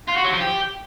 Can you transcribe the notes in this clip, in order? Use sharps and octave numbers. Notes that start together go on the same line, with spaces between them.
F4
F#4
F#3
F3
G4